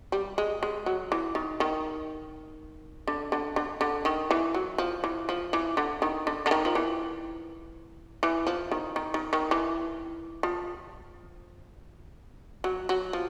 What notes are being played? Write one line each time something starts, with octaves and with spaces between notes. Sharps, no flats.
G3
G#3
G#3
F#3
E3
D#3
D#3
D3
D3
D3
D3
D#3
E3
F#3
F3
E3
F3
E3
D3
D#3
D3
D3
D#3
F3
E3
E3
F3
D#3
D#3
D#3
D#3
E3
F3
F#3
F#3
F3